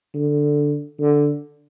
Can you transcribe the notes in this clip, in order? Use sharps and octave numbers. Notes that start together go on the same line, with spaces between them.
D3
D3